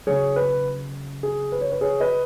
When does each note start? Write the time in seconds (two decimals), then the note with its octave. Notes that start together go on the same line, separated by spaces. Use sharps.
0.07 C#3 F#3 G#4 C#5
0.36 B4
1.23 G#4
1.52 B4
1.61 C#5
1.72 B4
1.81 G#4 C#5
2.00 B4 D#5